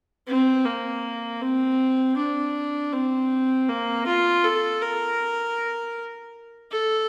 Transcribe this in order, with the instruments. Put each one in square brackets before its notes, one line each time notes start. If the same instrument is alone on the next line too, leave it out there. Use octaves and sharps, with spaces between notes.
[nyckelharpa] C4
A#3
C4
D4
C4
A#3
F4
A4
A#4
A4